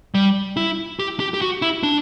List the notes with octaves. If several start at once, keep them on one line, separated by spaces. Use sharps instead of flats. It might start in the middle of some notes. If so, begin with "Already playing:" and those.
G3
E4
G4
G4
G4
F#4
E4
D4